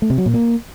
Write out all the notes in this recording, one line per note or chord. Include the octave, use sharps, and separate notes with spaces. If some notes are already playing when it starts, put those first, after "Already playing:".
A3
C3
F#3
A#2
A#3